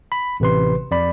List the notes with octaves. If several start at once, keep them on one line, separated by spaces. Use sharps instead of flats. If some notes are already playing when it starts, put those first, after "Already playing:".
B5
A1 C3 B4 C6
F2 D5 B5